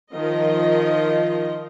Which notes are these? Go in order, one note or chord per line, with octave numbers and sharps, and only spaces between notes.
D#3 F3 F4 D#5